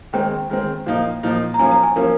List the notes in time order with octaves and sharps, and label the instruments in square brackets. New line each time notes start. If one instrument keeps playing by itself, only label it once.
[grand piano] D#3 G#3 C4 [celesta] G5
[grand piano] D#3 G#3 C4
A#2 F3 A#3 D#4
A#2 F3 A#3 D#4
[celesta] A#5
[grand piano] F3 A#3 C#4 [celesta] G#5
[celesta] A#5
G#5
[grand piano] F3 A#3 C#4 [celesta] A#4